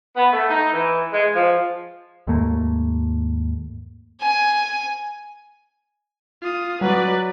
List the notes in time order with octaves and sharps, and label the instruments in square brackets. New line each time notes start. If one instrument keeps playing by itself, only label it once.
[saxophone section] B3
A3
D#4
E3
G#3
F3
[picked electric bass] D#2 G#2 A3 A#3
[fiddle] G#5
[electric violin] F4 D#6
[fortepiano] F#3 [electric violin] B4 D5